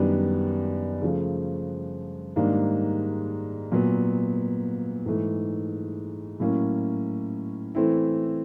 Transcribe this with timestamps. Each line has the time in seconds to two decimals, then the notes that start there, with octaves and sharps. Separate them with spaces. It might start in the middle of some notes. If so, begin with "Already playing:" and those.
Already playing: F#2 D#3 G3 B3 D4
1.02 C#3 F3 A3
2.36 G#2 D#3 G3 A#3 D4
3.72 A#2 F#3 B3
5.06 G#2 E3 A3
6.40 A2 F#3 A#3 C#4
7.75 E3 A3 C4 E4